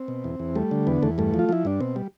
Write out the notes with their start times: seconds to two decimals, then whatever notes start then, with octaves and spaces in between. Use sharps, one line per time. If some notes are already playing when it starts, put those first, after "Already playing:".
Already playing: C4
0.08 B2
0.24 E2
0.40 E2
0.55 G3 A3
0.71 D3
0.87 E2 B3
1.02 E2 A3
1.18 G2 A3
1.34 F3
1.39 F4
1.49 F3 E4
1.65 G2 D4
1.80 B2 C4
1.96 G3